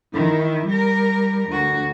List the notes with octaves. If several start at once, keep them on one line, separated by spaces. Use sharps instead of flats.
D#3 E4
G3 A#4
D2 F#4